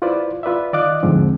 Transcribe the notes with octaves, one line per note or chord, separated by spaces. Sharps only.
E4 F4 B4 C5 D5
F4 B4 D5 E5
D#3 D5 D#5 F5 D6 F#6
E2 G#2 D3 F3 C4